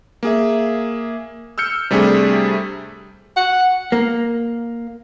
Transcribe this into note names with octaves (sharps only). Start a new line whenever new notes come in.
A#3 G#4 E5
E6 F6 G6 C#7
C3 G3 A3 D4 G#4
F#5
A#3